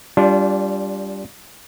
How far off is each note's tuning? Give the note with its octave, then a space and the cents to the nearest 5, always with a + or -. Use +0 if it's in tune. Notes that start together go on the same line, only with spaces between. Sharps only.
G3 +0 D4 -30 F4 +0